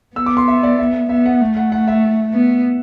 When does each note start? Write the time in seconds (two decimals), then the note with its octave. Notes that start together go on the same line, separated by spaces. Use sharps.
0.16 B3 E6
0.26 D6
0.37 C6
0.48 E5
0.63 D5
0.79 E5
1.09 B3 E5
1.26 F#5
1.41 A3
1.57 F#5
1.72 F#5
1.88 E5
2.34 B3